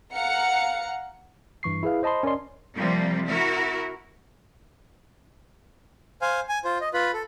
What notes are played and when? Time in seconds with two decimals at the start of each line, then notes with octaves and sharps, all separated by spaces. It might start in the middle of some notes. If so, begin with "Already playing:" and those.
0.14 F5 F#5 A#5 C#7
1.63 G2 E3 C#6 C7
1.83 E4 G#4 B4 F5
2.03 C5 D#5 A5 B5 C6
2.23 C#4 A#4 D5 D#5 C6
2.77 C3 F3 G3 A#3
3.28 E4 F#4 A#4
6.22 C5 F5 G#5
6.49 G#5
6.65 F4 C5
6.81 D#5
6.94 F4 B4 B5
7.14 A4